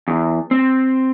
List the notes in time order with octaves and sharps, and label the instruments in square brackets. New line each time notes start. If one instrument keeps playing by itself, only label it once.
[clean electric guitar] E2
C4